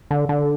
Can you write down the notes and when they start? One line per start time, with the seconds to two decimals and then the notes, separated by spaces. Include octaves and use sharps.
0.11 D3
0.29 D3